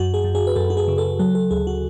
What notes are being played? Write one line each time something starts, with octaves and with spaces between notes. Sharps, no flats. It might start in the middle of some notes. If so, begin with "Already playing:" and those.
Already playing: F#2 F#4
G#4
F#2
G#4
B4
F#2 A4
F#4
G#4
C#3
A4
F#3 A4
A4
D2 G#4
F#4